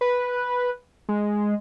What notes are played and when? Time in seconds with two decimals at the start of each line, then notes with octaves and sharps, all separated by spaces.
0.01 B4
1.09 G#3